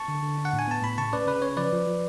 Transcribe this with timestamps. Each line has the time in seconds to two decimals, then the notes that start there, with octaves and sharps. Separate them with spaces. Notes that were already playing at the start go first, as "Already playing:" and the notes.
Already playing: A5 C#6
0.08 D3
0.23 D3
0.38 D4
0.45 F#5
0.53 A2
0.59 G#5
0.68 B3 A5
0.82 A2 B5
0.98 C#3 A5 C#6
1.13 C#4 B4 D5
1.27 C#3 B4
1.42 C#4 C#5
1.57 F3 B4 D5
1.73 F3
1.87 F3